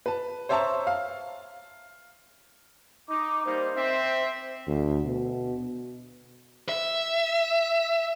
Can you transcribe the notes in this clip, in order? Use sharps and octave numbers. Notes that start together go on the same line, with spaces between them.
B4 A5
C5 C#5 E5 A5 A#5 C#6
F5
D#4 D6
G3 A#3 D#4 C5
C4 E5
D2
B2
E5